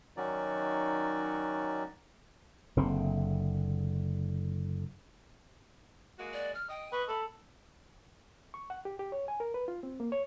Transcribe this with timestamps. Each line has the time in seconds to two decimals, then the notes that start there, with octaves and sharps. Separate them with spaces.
0.17 D#3 F#3 C#4 D#4 F#4 D5
2.77 F#1 D3 C4
6.19 G#3 A#3 F#4
6.33 D5
6.54 F6
6.70 D#5 G5
6.92 B4 C#6
7.08 A4 B5
8.54 C#6
8.70 F#5
8.85 G4
8.99 G4
9.12 C#5
9.28 G#5
9.40 A#4
9.54 B4
9.68 F4
9.83 C4
10.00 A#3
10.12 C#5